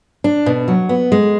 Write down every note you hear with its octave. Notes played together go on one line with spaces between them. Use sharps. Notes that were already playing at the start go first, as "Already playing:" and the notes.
D4
B2
F#3
B3
G#3